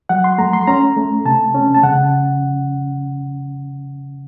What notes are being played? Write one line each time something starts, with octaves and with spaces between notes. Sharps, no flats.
F#3 F#5
C6
A3 A#5
C6
C#4 A#5
A3
C3 A5
C#4
A5
C#3 F#5